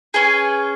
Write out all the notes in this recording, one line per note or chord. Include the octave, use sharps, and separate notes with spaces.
C#4 G#4 B4